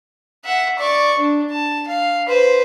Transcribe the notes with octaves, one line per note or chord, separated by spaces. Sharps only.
E5 F#5
D5 C#6
D4
A5
F5
B4 C5